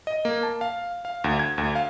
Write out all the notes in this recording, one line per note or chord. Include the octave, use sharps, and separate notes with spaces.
D#5
A#3
A5
F5
F5
D2
G#6
D2
F5